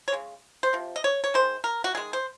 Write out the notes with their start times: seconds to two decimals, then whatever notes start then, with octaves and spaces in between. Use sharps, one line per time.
0.08 C#5
0.12 C#3 G#3
0.63 C5
0.73 C3 F3
0.96 D#5
1.04 C#5
1.24 C#5
1.34 D#3 G#3 C5
1.64 A#4
1.84 F#4
1.95 D#3 G#3 G#4
2.13 C5